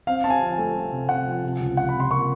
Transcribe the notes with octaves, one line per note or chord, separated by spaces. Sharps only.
C4 F5
C4 A5
G#5
F3
A3
A3
C3
C3 F#5
F3
C3
C#2
F3 F#5
B5
C3
C6
A#3 C#6